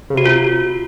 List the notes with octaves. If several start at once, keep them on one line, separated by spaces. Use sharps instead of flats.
C#3
C3 F#4
F4